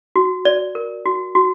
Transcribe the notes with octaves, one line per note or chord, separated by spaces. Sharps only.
F#4
D5
A#4
F#4
F#4